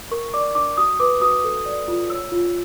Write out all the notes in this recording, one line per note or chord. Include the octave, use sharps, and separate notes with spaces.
A#4 C#6
D5 D6
D4 D6
F#4 D#6
B4 D6
F#4 D#6
A4
D5
F4
C#5 E6
F4